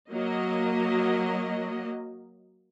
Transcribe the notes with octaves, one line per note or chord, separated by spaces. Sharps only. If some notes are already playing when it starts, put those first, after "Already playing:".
F#3 A#3 D#5